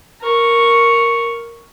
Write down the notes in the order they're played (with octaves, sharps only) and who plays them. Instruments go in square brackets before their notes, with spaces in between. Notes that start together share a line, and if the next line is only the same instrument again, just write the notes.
[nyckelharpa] A#4 C#6